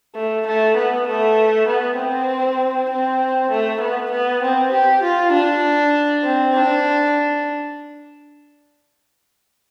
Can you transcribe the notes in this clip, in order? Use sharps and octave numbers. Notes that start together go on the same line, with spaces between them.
A3
A3
B3
A3
B3
C4
C4
A3
B3
B3
C4
G4
F4
D4
C4
D4